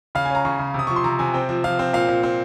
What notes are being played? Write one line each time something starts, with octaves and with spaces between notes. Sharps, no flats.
C#3 F5
C#4 G#5
A#5
C#3 C#6
C#3
C3 D#6
F3 C#6
C6
C3 A#5
C3 G#5
C4 G5
F3
F3 F5
C4
A#2 F5
A#2
C4